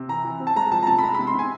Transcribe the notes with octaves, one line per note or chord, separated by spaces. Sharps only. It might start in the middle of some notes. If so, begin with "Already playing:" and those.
Already playing: C3
E3 A#5
E3
C4
A5
G#3 A#5
F3 A5
A#5
C3 A5
B5
G#3 A#5
B5
C3
C6
C3 G#5